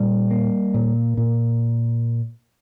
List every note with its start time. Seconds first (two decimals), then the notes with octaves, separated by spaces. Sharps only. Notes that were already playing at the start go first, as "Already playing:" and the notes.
Already playing: A#2 G3
0.31 A#3
0.74 A#2
1.17 A#2